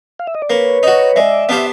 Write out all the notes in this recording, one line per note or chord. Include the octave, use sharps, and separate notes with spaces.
F5
E5
D#5
D5
A#3 B4 C#5
D#4 F#4
G#3 D5 E5
B3 D4 G4 C5 F5
E5